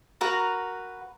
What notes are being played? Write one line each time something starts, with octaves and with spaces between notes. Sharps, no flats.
F#4 A#4 B4 A#5